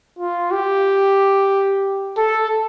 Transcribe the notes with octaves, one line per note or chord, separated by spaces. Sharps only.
F4
G4
A4